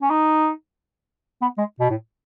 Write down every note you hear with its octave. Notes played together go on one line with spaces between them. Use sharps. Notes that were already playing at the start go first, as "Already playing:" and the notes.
C#4
D#4
B3
G#3
B2
A2